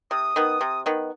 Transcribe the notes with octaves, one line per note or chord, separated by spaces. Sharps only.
C3 D#6
D#3 B3
C3
D#3 B3